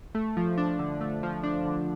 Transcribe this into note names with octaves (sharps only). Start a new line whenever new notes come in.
A3
F3
D4
D3
A3
F3
D4
D3